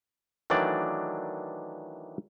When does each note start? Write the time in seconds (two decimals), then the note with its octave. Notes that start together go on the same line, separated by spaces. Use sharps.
0.50 D#3 E3 F#3 A3 D4 D5